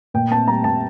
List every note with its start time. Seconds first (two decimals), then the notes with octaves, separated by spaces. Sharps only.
0.14 A#2 G5
0.31 C4 A5
0.48 G3 A#5
0.64 A#2 A5